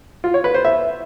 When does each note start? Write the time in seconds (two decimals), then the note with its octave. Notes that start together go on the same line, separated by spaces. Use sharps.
0.24 F4
0.34 C#5
0.44 B4
0.54 C5
0.65 E5